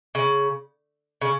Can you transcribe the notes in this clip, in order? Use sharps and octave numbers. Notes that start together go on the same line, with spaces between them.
C#3
C#3